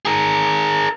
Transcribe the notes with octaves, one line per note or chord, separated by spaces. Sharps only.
G#4 A#4